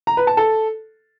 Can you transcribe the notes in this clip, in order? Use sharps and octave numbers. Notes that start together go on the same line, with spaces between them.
A#5
B4
A5
A4